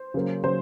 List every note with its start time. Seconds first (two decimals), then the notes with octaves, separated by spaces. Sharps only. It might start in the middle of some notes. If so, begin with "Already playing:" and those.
Already playing: C5
0.14 C#3 F#3 A#3
0.44 C#3 F#3 C5